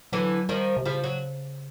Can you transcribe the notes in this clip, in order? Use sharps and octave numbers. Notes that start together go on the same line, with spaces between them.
D3 E3 F#3
D#3 F3 G3
C3
C#3 F3 G3
F#3